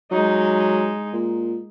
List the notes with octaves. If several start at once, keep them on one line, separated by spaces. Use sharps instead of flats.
F#3 G#3 D#4
A#2